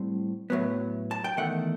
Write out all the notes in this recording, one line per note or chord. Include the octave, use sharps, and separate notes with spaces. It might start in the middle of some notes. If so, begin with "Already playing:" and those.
Already playing: A2 G3 C4
A2 F#3 B3
A5
G5
E2 D#3 A3 F#5